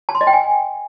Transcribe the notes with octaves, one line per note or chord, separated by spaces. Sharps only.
A5
C6
D#5
G5
G#5